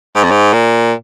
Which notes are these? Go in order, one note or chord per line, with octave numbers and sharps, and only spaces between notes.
G#2
F2
G#2
A#2